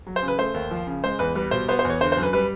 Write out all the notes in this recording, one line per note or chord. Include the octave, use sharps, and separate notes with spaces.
F#3
C5
C#3
B4
A3 C5
D#2
F3
C#3
G#3 C5
E2 B4
G3 B4
B2 C5
B3 C5
C5
E2 C#5
D3 C5
C5
F#2
B4
G3 B4